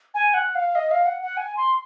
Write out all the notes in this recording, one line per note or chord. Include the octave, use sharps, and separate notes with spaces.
G#5
F#5
F5
D#5
F5
F#5
F#5
G#5
C6